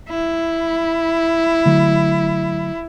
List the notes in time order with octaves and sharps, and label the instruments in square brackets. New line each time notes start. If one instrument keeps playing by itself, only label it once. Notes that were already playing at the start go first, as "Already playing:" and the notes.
[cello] E4
[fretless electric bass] D3 F#3 A3